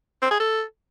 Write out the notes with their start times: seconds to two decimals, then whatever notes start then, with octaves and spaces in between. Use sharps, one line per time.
0.22 C4
0.31 G#4
0.40 A4